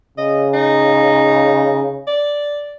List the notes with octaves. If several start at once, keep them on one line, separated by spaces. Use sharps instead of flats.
C#3 D#5
D#4
D5